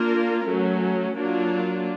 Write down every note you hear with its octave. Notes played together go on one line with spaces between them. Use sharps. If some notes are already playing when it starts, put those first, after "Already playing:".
Already playing: A#3 D4 F4 A#4
F#3 A3 C#4
F#3 A#3 D4 F4